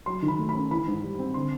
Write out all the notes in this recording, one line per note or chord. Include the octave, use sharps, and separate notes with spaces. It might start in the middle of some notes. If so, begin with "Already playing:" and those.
F#3 C6
D#3
B5
A3
B5
C#4
E3 B5
G#2
G3
C4
D3 C6